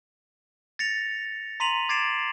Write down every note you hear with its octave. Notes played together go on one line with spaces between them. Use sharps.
A6 A#6 C#7 F7
A#5 C6 B6 D#7 F7 F#7
D6 G#6 A6 C7 D7 E7